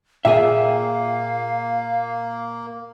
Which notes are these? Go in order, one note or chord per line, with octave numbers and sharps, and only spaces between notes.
A#2 A#3 G#4 E5 F5 G5